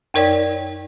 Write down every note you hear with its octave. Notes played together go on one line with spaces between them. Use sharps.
F#2 D#4 A#4 C#5 D5 G5